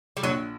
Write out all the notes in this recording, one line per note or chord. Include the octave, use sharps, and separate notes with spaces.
G3
A#1 F#3